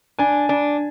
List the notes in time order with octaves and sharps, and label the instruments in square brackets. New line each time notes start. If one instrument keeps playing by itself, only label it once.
[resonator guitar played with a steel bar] D4 [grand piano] G#5
[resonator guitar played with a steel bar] D4